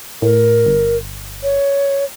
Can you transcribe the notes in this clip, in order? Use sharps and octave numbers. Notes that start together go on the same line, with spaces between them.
A2 A#4
G1
C#5